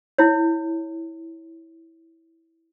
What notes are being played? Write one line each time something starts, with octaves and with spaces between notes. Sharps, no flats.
E4 C#5